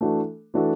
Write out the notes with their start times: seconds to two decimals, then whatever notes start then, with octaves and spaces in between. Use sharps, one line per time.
0.01 E3 A3 D4 F#4 A4
0.54 E3 A3 D4 F#4 A4